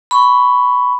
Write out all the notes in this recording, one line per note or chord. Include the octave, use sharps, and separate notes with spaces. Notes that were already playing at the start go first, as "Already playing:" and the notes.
B5 C#6